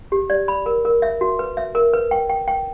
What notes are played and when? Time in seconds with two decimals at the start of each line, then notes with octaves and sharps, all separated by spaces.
0.12 G4
0.30 D5
0.48 B5
0.66 A#4
0.85 A#4
1.02 E5
1.21 F#4
1.39 B4
1.57 E5
1.75 A#4
1.93 B4
2.11 G5
2.30 G5
2.48 G5